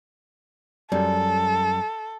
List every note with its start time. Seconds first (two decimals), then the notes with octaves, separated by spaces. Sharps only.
0.92 F#2 G3 A4